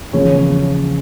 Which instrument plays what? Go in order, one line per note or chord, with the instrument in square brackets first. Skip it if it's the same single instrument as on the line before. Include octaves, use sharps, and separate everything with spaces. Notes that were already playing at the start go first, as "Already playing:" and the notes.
[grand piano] E2 C#3 F3 A#3 C#5